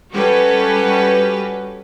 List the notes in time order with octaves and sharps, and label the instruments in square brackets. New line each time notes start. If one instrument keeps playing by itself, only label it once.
[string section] G3 C#4 F#4 G4 A4 B4